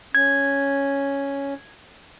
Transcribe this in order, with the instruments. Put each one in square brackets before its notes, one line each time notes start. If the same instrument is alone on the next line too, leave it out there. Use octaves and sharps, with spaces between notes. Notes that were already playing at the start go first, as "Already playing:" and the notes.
[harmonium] C#4 [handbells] G#6